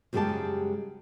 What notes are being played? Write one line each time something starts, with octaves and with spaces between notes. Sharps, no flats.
F#2 C#3 G3 G#3 G4 A5